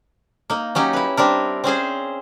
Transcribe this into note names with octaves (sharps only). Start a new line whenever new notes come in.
A#3 D#4
F#3 C#4 D#4 G4
E4 B4
G3 C4 D4 A#4
C4 C#4 G#4 C5